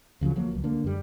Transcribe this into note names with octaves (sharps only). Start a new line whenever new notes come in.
D2 C#3 F3 F#3
F3 F#3 A#3
D#1 C#2
D3 A#3
F#2 G3